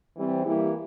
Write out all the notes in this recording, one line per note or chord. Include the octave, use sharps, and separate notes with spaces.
E3 G3 C4
E3 G3 A#3 E4 G4